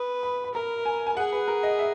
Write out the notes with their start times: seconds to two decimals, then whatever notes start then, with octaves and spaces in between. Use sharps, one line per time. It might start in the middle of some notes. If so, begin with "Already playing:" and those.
Already playing: B4 D#6
0.23 B5
0.44 B5
0.54 A#4 A#5
0.85 G#5
1.07 G#5
1.17 G#4 F#5
1.33 B4
1.48 A#4
1.63 D#5
1.79 E5